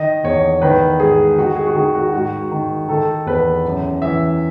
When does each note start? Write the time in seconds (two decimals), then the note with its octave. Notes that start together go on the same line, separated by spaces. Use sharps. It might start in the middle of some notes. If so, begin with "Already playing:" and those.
Already playing: D#3 D#5
0.24 E2 C#5
0.62 D#3 B4
1.00 G#2 G#4
1.37 D#3 F#4
1.56 G#4
1.67 F#4
1.75 D#3 G#4
1.95 F#4
2.13 G#2 F#4
2.51 D#3
2.88 D#3 A4
3.26 E2 B4
3.65 F#2
4.02 E3 E5